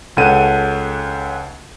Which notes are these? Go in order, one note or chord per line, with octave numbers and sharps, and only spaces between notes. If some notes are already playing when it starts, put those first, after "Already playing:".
C#2 C#4 A4 F#5 D#7